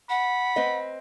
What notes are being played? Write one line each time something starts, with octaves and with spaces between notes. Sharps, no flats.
F#5 B5
C4 B4 D#5